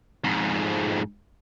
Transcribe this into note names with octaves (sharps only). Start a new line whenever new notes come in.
F2 G#2